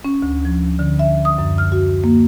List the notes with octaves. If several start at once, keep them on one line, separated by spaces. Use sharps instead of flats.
C#4
D2
F3
D3
E5
D#6
F#2
F6
F#4
A#3